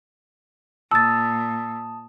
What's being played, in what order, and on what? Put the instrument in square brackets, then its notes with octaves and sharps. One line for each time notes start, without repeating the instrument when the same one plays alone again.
[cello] A#2 [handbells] A5 D#6 [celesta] E6 A6